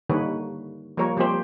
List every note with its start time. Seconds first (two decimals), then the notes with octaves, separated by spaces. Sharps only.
0.09 D3 D#3 G3 A#3 B4 C#5
0.97 F3 G3 A#3 A#4 C#5
1.17 F3 G3 A#3 C4 G4 C5